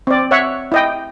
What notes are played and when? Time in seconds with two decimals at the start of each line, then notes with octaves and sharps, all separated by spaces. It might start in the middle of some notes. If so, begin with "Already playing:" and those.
0.07 C4 D5
0.31 C#5 E5 F#5
0.72 E4 D#5 G5